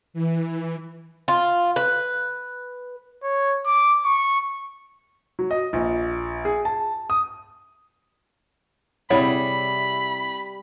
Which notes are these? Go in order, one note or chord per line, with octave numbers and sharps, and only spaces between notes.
E3
F4
B4
C#5
D6
C#6
F#3
D#5
A#1
G#4
A5
D#6
C3 G3 E4 G#4 C#5 F#5 B5